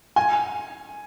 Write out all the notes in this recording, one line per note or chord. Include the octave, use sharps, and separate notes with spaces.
G#5